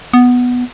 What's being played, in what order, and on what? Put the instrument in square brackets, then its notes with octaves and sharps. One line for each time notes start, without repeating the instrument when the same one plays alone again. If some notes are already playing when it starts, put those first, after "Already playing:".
[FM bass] B3